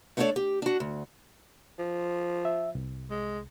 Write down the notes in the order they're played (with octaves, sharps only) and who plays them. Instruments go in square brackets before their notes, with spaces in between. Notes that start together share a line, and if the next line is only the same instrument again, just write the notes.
[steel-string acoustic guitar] A3 B3 D4 A4 C#5 D5
G4
D4 F#4
D2
[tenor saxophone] F3
[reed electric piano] E5
C2
[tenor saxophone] G#3